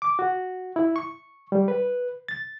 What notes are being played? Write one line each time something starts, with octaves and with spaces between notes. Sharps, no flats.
D6
F#4
E4
C#6
G3
B4
A6